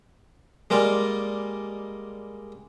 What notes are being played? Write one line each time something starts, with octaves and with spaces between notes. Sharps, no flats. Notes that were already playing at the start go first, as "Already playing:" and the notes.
G3 G#3 A#3 D5